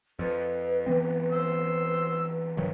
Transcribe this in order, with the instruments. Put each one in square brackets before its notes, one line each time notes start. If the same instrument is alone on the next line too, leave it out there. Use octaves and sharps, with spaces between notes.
[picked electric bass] F2 [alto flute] B4
[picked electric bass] E3 B3 C4
[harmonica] C5 E6
[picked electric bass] G2 D#3 F#3